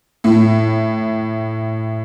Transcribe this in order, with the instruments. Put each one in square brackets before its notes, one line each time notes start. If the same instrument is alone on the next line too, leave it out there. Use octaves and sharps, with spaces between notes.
[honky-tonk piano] A2